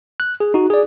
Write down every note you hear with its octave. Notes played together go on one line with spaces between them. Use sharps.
F#6
G#4
D#4 F#4
G#4 D5